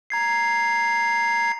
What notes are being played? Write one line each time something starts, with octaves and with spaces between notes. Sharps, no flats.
A#5 G#6 C7